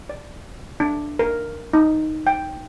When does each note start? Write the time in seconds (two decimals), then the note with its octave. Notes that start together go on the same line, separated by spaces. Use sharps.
0.09 D5
0.80 D4
1.19 A#4
1.73 D#4
2.27 G5